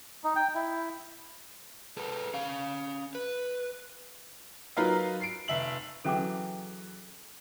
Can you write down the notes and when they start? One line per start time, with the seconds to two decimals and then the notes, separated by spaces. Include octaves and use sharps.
0.24 D#4
0.36 G5
0.55 E4
1.97 G#4 A4 B4
2.34 C#4 F5
3.15 B4
4.77 F#3 D#4 F4 A#4 B4 F5
5.20 C7 D7
5.48 F1 E5 F#7
6.04 C#3 E3 F#3 A4 G5 D6